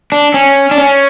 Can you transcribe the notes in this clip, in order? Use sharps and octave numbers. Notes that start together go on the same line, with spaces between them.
D4
C#4
D4
C#4